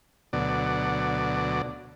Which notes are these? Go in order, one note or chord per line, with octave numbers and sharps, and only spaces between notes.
D2 B2 F#3 D5